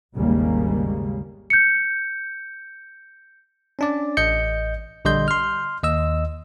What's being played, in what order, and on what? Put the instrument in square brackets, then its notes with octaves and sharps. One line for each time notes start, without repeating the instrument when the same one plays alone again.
[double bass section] G#1 D#2 C#3 G3 G#3 A#3
[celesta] G6 C#7
[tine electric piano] C#4 D4 D5
A1 D#5 G6 C#7
A#1 D3 G3 D#5 C6 G6
C6 F6
D#2 D#5 E6